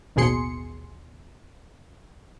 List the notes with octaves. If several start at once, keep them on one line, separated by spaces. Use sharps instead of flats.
A1 D#2 B2 G#4 C6 C#7